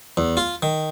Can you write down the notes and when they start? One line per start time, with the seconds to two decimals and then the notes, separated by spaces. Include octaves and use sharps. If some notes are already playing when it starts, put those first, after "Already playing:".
0.17 E2
0.37 F4
0.63 D#3